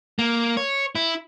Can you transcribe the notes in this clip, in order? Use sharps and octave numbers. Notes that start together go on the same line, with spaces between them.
A#3
C#5
E4